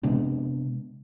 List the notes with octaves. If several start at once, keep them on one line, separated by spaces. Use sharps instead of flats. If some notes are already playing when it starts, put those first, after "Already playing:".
C3 G#3 B3 D4